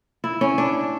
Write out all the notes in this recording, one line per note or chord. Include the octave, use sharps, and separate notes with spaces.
E4
C#4
D4